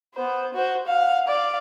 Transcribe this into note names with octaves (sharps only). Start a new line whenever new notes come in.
B3 C5
F#4 C5
F5 F#5
D5 F5